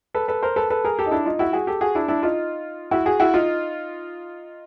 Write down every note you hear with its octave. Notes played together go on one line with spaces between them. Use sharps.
A4 B4
A4 B4
A#4 C5
A4 B4
A4 B4
G#4 A#4
G4 A4
D#4
D4 E4
D#4 F4
E4 F#4
F#4 G#4
G4 A4
F#4 G#4
D4 E4
D4 E4
D#4 F4
E4 F#4
F#4 G#4
E4 F#4
D#4 F4